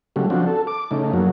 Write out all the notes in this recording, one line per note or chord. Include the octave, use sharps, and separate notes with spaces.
C#3 F#3 G3 A3
F3 C4 D4 F#4
A4
D6
C#3 A3 D#4
F#2 F#3 A#3